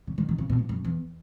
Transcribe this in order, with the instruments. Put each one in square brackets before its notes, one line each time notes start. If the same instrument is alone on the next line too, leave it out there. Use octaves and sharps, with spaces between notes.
[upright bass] C#3
D#3
D#3
C#3
B2
A#2
F#2
E2